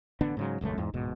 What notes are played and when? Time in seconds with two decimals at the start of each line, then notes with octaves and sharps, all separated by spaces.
0.21 A1 D3 B3 D4
0.37 G#2 C#3 F#3
0.61 D#1 C#2 F#2 A3
0.78 E2 G#2
0.94 D1 G#2 B2